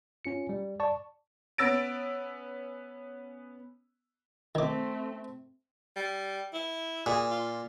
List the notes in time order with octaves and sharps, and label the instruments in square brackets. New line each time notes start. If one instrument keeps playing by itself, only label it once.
[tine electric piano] C#4 F4 C#7
G3
D5 A5 C#6
[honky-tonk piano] B3 C#4 E6 A6 D7
[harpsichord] D#3 D6 [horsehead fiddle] A3 C4
[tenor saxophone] G3
E4
[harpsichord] A#2 [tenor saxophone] G#4
[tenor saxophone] F4